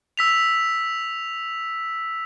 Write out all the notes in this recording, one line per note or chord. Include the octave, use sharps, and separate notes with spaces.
E6 B6 F7